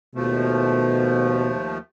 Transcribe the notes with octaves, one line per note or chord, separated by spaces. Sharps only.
D#2 B2 F3 A3